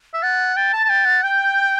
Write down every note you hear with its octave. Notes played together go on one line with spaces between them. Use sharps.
E5
F#5 A6
G5 A6
A5
A5
G5
F#5
G5 G6